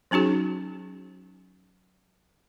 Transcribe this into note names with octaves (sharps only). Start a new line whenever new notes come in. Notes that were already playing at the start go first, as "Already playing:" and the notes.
F#3 C#4 D#4 F#4 G#4